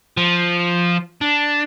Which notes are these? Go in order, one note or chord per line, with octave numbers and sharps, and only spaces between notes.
F3
D4